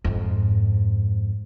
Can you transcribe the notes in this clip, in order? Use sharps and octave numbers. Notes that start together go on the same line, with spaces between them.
F2 G#2